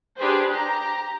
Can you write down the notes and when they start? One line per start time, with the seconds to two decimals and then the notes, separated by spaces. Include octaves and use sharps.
0.18 D4 G4 G#4 B4 C5
0.50 G4 A#5